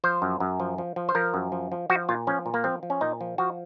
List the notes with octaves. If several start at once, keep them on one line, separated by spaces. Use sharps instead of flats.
F3 C5
F#2
F#2
F3
F3
F3
C5
F3 A#4
F#2
F3
F3
F3 F#4
A#2 F4
F3 C#4
A#2
A#3
F3 C4
F3
C#4
A#2 D#4
F3
F3 F#4